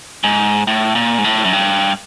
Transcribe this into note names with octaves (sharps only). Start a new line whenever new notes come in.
G#2
A2
A#2
G#2
A2
F#2
G2